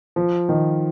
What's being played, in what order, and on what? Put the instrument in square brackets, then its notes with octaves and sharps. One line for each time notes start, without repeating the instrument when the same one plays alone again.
[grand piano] F3
D#3